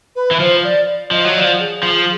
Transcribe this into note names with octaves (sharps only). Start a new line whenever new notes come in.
B4
E3
F3 C5
D5
F3 D#5
F#3
F3 D5
G#4
F3